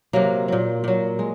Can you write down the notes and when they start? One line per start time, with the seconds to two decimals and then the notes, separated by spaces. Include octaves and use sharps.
0.13 C3 F#3 A#3
0.48 A#2 F#3
0.84 A#2 F#3
1.19 G#3